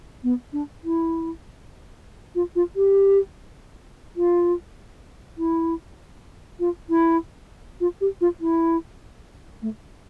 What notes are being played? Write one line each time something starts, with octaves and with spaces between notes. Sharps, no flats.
B3
D4
E4
F4
F4
G4
F4
E4
F4
E4
F4
G4
F4
E4
A3